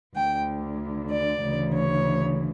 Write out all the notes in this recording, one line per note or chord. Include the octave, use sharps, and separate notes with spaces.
D2 D3 G5
D5
D2 C#3 E3
C#5